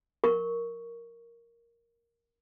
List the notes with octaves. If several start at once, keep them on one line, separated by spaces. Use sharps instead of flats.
A#4 C#6